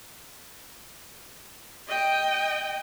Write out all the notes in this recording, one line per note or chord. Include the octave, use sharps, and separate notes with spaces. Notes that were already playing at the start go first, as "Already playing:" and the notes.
D#5 G5